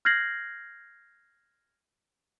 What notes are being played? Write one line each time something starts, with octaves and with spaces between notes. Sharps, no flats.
F6 G6 G#6 A#6 C7 F#7